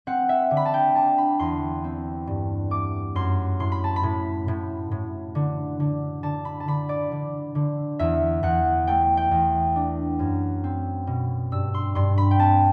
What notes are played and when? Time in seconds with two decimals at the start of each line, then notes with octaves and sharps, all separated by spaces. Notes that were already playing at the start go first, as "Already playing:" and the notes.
0.07 C4 F#5
0.29 E5
0.51 D3
0.57 B5
0.65 A5
0.74 G5
0.95 D4 A5
1.18 B5
1.39 E2 C6
1.84 C4
2.27 G2
2.71 A3 D6
3.15 F#2 C6
3.60 A2 C6
3.72 B5
3.84 A5
3.96 B5
4.03 A2
4.48 A2
4.91 A2
5.35 D3
5.80 D3
6.23 D3 A5
6.45 B5
6.60 A5
6.68 D3 B5
6.89 D5
7.12 D3
7.55 D3
7.99 E2 E5
8.43 E2 F#5
8.87 A3 G5
9.17 G5
9.31 E2
9.76 D4
10.19 F#2
10.64 C4
11.07 B2
11.52 G2 E6
11.74 C6
11.95 G2 C6
12.18 B5
12.31 G5
12.39 C4 A5